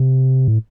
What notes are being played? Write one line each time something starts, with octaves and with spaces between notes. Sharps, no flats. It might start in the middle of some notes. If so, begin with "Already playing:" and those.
Already playing: C3
A2